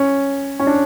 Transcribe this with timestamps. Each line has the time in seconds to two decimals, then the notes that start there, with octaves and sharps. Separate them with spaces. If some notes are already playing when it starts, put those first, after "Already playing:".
Already playing: C#4
0.60 C#4
0.67 D4